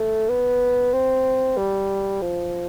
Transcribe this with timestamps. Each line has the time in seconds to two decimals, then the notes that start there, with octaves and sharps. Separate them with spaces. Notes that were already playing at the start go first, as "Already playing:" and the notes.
Already playing: A3
0.28 B3
0.93 C4
1.57 G3
2.21 F3